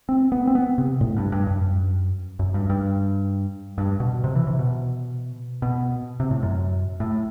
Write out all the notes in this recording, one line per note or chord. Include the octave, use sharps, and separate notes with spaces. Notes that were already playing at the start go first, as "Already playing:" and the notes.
C4
B3
C4
B3
C3
A2
G2
G2
F#2
F#2
G2
G2
G2
B2
C3
E3
C3
B2
B2
C3
A2
F#2
A2